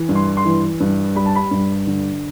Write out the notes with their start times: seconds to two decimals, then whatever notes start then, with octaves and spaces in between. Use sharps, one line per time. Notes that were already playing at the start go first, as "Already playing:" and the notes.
Already playing: E3
0.09 G2
0.15 C6
0.37 C6
0.45 E3
0.80 G2
1.16 G3 B5
1.26 A5
1.35 B5
1.51 G2
1.87 D3